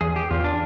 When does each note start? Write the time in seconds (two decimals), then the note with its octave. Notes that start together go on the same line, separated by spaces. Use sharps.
0.01 E2 G#4
0.16 G4
0.31 E2 F4
0.44 D4